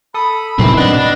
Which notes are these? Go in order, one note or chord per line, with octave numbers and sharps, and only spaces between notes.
A4 B5 D#6
F#2 A2 C3 D#3 E3 F#3 C4
B2 B3 D4 B4 D#5 A6